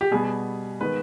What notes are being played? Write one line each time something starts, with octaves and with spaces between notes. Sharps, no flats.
G4
B2 G3 B3 G#4
D#3 G#3 B3 B4